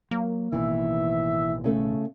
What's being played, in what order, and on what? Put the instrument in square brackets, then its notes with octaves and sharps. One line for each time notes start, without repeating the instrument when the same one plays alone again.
[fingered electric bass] F#3 [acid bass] A#3
[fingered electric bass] A1 B2 D#3 [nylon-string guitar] E3 [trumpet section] E5
[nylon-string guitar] C#3 A3 A4